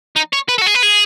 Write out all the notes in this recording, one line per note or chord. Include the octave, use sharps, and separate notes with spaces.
D#4
C#5
B4
A4
F#4
G#4
B4
G#4